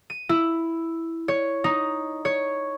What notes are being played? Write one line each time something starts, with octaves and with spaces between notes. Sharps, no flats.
D#7
E4
C#5
D#4
C#5